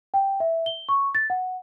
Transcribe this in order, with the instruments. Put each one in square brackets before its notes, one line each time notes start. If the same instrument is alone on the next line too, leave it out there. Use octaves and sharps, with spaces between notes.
[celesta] G5
E5
G7
C#6
A6
F#5